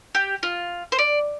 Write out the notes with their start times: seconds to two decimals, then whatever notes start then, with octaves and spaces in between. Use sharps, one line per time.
0.15 G4
0.43 F4
0.92 C5
0.99 D5